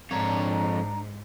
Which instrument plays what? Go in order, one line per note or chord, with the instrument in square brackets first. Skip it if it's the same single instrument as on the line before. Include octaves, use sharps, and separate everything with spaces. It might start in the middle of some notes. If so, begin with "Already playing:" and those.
[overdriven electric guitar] F2 C#5 [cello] G#2 [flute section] D4 A#5